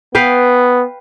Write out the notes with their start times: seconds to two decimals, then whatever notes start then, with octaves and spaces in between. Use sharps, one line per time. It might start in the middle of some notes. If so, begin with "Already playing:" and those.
0.15 B3 B4 F5 G5